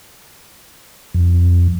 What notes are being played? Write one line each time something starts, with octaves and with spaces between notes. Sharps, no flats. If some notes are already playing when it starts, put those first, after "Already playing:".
F2